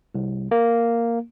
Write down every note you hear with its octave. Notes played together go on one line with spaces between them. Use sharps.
C2
A#3